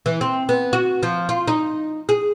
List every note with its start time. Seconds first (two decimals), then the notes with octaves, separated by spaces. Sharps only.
0.06 E3
0.21 C4
0.49 B3
0.73 F#4
1.03 F3
1.29 F4
1.48 D#4
2.09 G#4